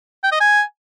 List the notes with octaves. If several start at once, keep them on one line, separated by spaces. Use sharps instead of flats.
G5
D#5
G#5